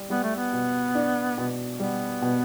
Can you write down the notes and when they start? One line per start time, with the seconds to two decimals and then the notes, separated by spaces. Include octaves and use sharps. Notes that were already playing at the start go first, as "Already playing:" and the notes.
Already playing: G3
0.10 G3 B3
0.23 A3
0.36 B3
0.53 B2
0.95 D4
1.38 B2
1.79 G3 B3
2.22 B2